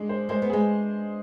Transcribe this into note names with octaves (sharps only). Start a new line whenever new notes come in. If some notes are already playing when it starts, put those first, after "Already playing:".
Already playing: G#3 D4 G#4
C5
G#3 C5
B3
G#3 G#4